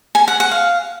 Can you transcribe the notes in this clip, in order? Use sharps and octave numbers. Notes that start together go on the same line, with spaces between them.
G#5
F#5
F#5
F5